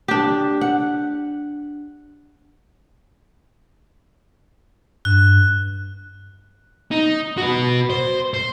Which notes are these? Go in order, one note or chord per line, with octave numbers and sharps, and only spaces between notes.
D4 G4
F#5
G2 F#6
D#4
F#4 B4
C5
C5